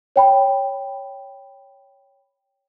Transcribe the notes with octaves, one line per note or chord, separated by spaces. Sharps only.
C#5 G5 B5